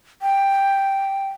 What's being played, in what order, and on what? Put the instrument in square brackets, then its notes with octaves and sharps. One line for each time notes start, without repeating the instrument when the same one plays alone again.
[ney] G5